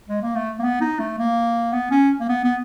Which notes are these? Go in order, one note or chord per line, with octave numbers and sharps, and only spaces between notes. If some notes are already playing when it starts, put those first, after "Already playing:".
G#3
A#3
A3
A#3
B3
D#4
A3
A#3
B3
C#4
A#3
B3
B3